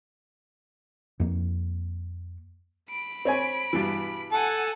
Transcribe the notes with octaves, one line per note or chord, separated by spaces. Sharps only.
F2 A#3
B5 D7
C4 C#5 G#5
G2 B2 E3
A4 F#5 G#5